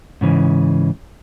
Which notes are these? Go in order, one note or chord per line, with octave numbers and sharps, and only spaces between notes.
G#2 C#3 E3